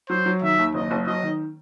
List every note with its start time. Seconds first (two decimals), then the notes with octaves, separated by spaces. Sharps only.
0.09 F#3 C5
0.26 F#3
0.42 D#3 E5
0.58 D#2
0.74 F#1 D#5
0.91 F#1
1.06 F#3 D#5
1.23 D#3